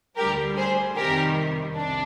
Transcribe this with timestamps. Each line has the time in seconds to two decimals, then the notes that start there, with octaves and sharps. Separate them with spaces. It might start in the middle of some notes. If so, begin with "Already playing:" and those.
0.17 D2 D3 G3 G4 A#4
0.56 G#4 C5
0.95 F2 C3 D#3 G3 G4 A#4
1.74 C2 C3 F3 D4